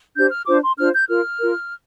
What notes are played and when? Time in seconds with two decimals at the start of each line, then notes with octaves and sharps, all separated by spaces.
0.15 D4 G4 C5 G6
0.31 F6
0.46 D4 F4 C5 D6
0.62 C6
0.77 D4 F4 C5 F6
0.94 G6
1.09 F4 A#4 F6
1.40 F4 A#4